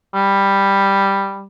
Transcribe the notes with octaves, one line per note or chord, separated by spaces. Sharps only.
G3